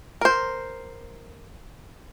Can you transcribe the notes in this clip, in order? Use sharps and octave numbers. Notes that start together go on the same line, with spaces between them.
A#4 C5